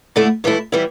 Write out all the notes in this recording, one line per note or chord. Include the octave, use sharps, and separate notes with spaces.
D3 A3 E4
G2 E3 A3 E4
E3 G3 E4